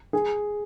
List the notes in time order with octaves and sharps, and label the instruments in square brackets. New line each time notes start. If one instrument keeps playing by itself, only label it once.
[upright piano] G#4